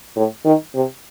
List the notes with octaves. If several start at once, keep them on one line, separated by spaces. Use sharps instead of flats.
A2
D#3
C3